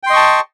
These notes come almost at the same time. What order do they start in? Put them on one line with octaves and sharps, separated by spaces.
G5 C6 D#5 C#6 A5